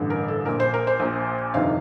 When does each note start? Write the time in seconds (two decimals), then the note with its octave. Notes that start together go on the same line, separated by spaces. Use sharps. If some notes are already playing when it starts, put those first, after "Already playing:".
Already playing: A1 G2 D3
0.10 A#4
0.28 A4
0.46 A#1 A#2 A#4
0.60 C5
0.74 A#4
0.87 C5
1.00 A#1 A#2
1.54 G1 F2 C3 D#3 F5